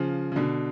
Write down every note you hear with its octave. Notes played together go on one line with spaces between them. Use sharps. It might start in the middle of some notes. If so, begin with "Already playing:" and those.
Already playing: C#3 F3
C#3
B2 D3